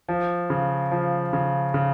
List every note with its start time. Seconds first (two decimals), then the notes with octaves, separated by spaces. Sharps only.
0.09 F3
0.50 C#3
0.91 F3
1.33 C#3
1.74 C#3